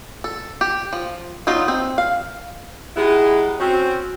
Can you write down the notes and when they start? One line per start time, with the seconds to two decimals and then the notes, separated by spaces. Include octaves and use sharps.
0.24 A4
0.61 G4
0.93 F3
1.47 F#3 B3 D#4 F4
1.68 C4
1.98 F5
2.97 G#3 B3 D#4 E4 G4 G#4
3.59 C4 C#4 F#4